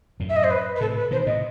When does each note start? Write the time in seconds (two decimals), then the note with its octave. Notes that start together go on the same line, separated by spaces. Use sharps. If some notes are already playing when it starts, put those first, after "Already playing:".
0.20 F#2 A2
0.29 E5
0.36 D#5
0.44 C5
0.50 B4
0.76 B4
0.81 A2 C3 A4
0.96 B4
1.11 B2 D#3 C5
1.26 A2 C3 D#5